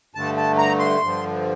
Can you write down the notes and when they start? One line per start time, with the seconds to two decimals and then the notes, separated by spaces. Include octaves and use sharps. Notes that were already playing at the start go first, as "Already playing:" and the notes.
0.15 G2 D3 A3 A5
0.37 A5
0.58 A#5
0.79 C6
1.01 G2 D3 F3